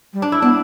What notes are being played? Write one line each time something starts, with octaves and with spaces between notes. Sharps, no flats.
G3
D4
E4
B3 D4